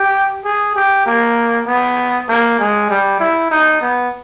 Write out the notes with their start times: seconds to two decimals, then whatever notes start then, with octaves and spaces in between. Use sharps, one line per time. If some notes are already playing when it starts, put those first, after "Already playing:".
Already playing: G4
0.44 G#4
0.76 G4
1.06 A#3
1.67 B3
2.28 A#3
2.59 G#3
2.90 G3
3.20 E4
3.51 D#4
3.81 B3